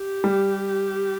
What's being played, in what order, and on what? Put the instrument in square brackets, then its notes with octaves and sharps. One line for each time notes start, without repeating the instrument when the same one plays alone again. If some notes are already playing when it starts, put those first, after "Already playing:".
Already playing: [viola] G4
[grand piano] G3